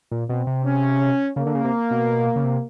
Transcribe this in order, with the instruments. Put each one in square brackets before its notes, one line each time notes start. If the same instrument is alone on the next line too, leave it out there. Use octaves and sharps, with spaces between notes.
[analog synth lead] A#2
[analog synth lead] B2 [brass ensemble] C4
[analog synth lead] C3
[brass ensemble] C#4
[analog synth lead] C#3 [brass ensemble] A#3
[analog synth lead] D3
C#3
C3
B2
C#3
C3